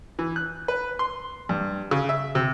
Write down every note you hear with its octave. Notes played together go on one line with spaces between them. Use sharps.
E3
F#6
B4
C6
G2
C#3
E5
C3